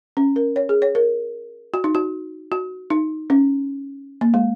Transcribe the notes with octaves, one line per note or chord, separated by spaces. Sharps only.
C#4
A#4
C#5
G#4
C#5
A#4
F#4
D#4
F#4
F#4
D#4
C#4
A#3
G#3